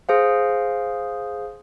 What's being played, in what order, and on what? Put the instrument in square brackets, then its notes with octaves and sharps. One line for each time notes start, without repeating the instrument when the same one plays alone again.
[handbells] G#4 C5 F5